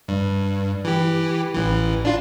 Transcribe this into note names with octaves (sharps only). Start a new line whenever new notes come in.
G2
E3 G4
A1 E3
D4 F4